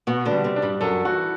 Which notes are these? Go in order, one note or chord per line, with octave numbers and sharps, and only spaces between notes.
B2 B3 F#4
D3 D4
G3
C3 C4
D4
G2 G3
F#2 F#3 A4
E3 F#4